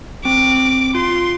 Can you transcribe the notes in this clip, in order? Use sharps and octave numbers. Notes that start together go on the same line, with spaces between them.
C4 D6
F4 C6